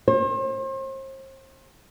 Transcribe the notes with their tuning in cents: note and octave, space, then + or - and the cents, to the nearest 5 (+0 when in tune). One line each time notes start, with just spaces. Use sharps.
C5 +40